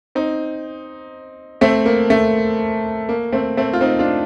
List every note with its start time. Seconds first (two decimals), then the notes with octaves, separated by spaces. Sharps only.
0.15 C4 D#4
1.61 A3 C4
1.86 A#3
2.10 A3
3.09 A#3
3.33 A3 C4
3.57 A3 C4
3.73 F4
3.81 C4 D#4
3.99 D4 F4